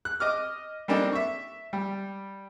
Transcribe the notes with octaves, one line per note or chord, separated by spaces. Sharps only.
F#6
D#5 D6 F6
G3 A#3 C4 D4 D#4 A4
E5 C#6
G3